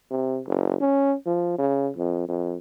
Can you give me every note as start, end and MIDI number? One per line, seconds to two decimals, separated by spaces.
0.11 0.40 48
0.47 0.76 30
0.81 1.15 61
1.26 1.56 53
1.58 1.91 49
1.96 2.24 41
2.29 2.57 41